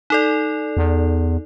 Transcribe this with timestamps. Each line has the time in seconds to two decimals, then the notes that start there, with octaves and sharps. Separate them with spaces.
0.10 D#4 A4 D5
0.77 E2